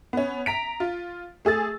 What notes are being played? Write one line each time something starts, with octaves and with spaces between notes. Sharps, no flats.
B3 C#4
A#5 B6 D7
F4
A3 G#4 E6 A6